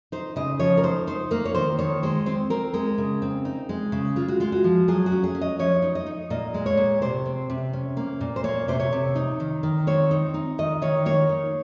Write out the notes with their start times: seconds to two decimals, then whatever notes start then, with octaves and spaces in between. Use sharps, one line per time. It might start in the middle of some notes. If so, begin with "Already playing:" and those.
0.12 D#4 C5
0.36 C#3 D#5
0.60 F3 C#5
0.77 A#4
0.83 D#4 C5
1.07 D#4 C5
1.31 A#3 A#4
1.45 C#5
1.54 D#3 C5
1.79 D#3 C#5
2.03 G#3 C5
2.26 C4 C5
2.50 C4 A#4
2.74 G#3 A#4
2.98 C#3
3.22 C4
3.45 D#4
3.69 G#3
3.92 C#3
4.16 G#3 F4
4.28 F#4
4.40 G#3 F4
4.52 F#4
4.64 F3
4.88 F#3 G#4
5.06 F#4
5.12 C#4
5.24 G#4
5.35 C#4
5.41 D#5
5.59 F3 C#5
5.82 D#4
5.95 D#5
6.06 D#4
6.30 A#2 D#5
6.54 G#3
6.66 C#5
6.77 A#2
7.02 C3 C5
7.25 C4
7.50 C3
7.73 C#4
7.97 A#3
8.21 A#2
8.36 C5
8.44 A#3 C#5
8.68 C3 C5
8.79 C#5
8.92 C3
9.15 D#4
9.40 D#3
9.63 D#3
9.87 C4 C#5
10.11 D#4
10.34 D#4
10.58 D#3 D#5
10.82 D#3 C#5
11.06 A#3 C#5
11.29 D#4